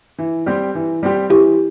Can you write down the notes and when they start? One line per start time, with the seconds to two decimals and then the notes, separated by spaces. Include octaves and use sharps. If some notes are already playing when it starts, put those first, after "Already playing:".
0.18 E3
0.46 G3 C4 G4
0.75 E3
1.03 G3 C4 G4
1.30 E3 E4 G4